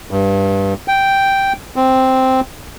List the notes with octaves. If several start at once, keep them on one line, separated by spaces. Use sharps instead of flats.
G2
G5
C4